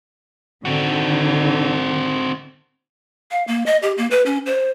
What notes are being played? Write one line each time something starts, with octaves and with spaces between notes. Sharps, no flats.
D3 D#3 C4 F#4
F5
A#3
D#5
G4
A#3
B4
C#4
C5